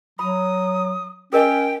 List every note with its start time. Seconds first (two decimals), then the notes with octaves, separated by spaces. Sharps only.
0.19 F#3 B5 D#6
1.33 C#4 G#4 A#4 D#5 G5